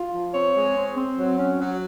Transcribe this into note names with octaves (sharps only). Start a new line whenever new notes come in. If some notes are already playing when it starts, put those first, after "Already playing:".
Already playing: F4
F3
C4 C#5
G#3
C4
C4
F#3
C#4
F#3